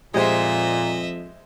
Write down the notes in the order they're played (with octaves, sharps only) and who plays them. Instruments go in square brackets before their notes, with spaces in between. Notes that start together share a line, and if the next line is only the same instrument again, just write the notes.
[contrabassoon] F2 [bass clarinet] A#2 [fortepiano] G#3 G4 C5 [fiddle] D#5 E5